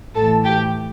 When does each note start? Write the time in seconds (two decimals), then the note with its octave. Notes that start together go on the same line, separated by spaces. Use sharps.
0.15 A2 E3 A4 A5
0.45 G4 G5